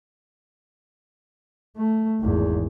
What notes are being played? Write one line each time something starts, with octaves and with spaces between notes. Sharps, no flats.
A3
G#1 E2